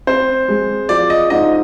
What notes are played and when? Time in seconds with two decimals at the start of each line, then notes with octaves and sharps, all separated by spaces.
0.07 C4 C5
0.48 G#3
0.89 F3 D5
1.10 D#5
1.30 G#2 D#5